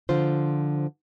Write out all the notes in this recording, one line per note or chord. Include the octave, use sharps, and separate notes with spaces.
D3 F3 F4 C5